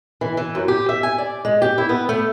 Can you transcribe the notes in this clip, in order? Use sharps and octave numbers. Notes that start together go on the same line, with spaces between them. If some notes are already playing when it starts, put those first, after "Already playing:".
E3
E3
F#2
G4
E5
G#5
D5
G#3
G4
E4
B3
A3